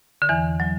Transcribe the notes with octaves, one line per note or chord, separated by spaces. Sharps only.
D3
E2 E3
F#3